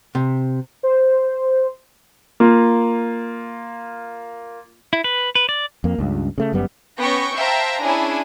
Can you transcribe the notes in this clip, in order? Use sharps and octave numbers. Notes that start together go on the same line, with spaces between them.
C3
C5
A#3 F4
E4
B4
B4
D5
F2 A#3
C#2 G2
C#3 A3
G1 F#2 G3 B3
B3 C#4 G5 C#6 G6 A#6
C5 E5 F5 G5 A5 A#5
C#4 D4 E4 G#4 G#5